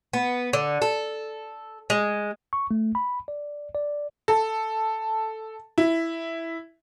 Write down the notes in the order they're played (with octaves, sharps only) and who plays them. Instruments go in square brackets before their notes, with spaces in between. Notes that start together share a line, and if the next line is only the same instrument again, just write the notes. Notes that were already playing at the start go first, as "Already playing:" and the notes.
[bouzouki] B3
D3
A4
G#3
[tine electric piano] C#6
A3
B5
D5
D5
[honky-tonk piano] A4
E4